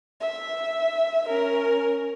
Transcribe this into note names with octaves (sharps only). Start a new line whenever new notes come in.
E5
C#4 A#4